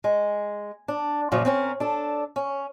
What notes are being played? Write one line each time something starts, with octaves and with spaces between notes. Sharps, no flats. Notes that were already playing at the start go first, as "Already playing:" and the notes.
G#3
D4
F#2 A#2 C#3 F3 F#3
C4 C#4 A#4
D4 A4
C#4